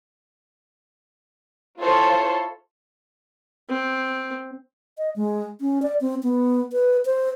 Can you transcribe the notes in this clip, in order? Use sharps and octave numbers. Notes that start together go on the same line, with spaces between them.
E4 F4 A4 C5 C#5 C6
C4
D#5
G#3
C#4
D5
C4
B3
B4
C5